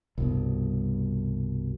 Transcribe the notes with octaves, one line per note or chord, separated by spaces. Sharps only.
C2 G2 B2